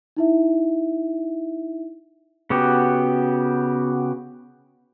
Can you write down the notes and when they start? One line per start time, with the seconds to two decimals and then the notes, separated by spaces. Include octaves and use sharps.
0.17 D#4 E4 E5
2.50 C#3 B3 F#4 G4